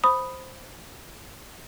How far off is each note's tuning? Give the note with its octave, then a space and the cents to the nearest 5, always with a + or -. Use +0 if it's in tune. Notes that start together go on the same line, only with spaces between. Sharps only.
C5 +0 B5 +0 D#6 +0